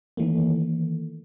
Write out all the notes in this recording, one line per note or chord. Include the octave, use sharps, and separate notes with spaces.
D#3 E3 A3 A#3